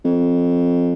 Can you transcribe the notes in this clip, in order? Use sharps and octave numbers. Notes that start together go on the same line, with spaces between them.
F2